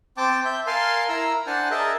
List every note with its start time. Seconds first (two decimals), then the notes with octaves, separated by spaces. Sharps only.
0.17 C4 G5 A5 D6
0.45 E5 G6
0.67 A#4 F5 G#5 A5 C6
1.09 E4 A#4 A#5 E6
1.47 D4 C5 F#5 G#5 A5
1.71 G#4 A#4 D#5 E5 A5